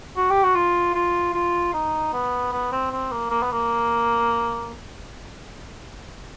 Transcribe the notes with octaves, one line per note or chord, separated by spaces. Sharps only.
F#4
G4
F#4
F4
F4
F4
D#4
B3
B3
C4
C4
A#3
A#3
B3
A#3